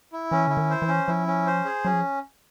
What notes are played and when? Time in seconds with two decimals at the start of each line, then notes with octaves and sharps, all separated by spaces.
0.12 E4
0.31 E3 C#4
0.47 D3 E4
0.57 D#3
0.70 C5
0.82 E3
0.88 C#4
1.07 F3 E4
1.27 C#4
1.46 C5
1.65 G#4
1.85 F#3 C#4
1.93 F3